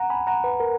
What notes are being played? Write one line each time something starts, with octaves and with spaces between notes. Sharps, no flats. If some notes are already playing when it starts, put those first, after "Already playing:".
Already playing: F#5 A#5
G#5 B5
F#5 A#5
B4
A#4